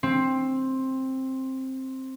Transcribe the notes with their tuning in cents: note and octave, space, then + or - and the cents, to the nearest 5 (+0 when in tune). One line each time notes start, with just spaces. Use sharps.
C4 +10